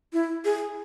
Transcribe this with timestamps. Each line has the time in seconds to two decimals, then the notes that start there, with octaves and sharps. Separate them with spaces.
0.13 E4
0.45 G#4